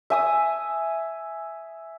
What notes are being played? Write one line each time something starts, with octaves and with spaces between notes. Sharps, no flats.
E5 G#5 D#6